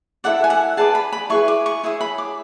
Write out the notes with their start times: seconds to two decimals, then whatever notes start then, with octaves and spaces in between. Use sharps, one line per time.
0.24 E4 A4 D5 F#5
0.44 G#5
0.50 F#5
0.77 G#4 B4 D5 A5
0.95 B5
1.12 B5
1.30 E4 G#4 B4 C#6
1.48 D6
1.66 C#6
1.83 E4 G#4 C#5
2.01 B5
2.18 D6